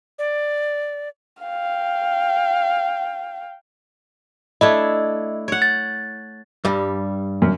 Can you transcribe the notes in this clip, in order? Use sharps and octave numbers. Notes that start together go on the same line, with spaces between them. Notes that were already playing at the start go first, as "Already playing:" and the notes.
D5
F5 G5
A3 D4 E4 D#5
C#5 F#5
A6
G2 G3
F#2